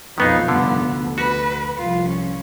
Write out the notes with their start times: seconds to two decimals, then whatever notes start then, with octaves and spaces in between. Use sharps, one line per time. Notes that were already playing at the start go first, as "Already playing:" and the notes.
0.18 B1 F2 D#3 B3 D#4 B4 F5
0.48 F1 G2 D3 B3
0.84 D2
1.18 F#4 B4
1.78 C2 F3 F4
2.08 C#4